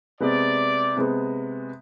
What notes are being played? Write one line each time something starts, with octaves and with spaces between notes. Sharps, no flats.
C3 G#3 B3 D5
C3 G#3 B3